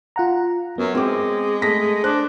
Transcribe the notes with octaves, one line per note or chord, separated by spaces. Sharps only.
F4 F#5 A#5
F#2 B3
G#3 C4 D6
A3 A#6 B6
D4 C5 F#6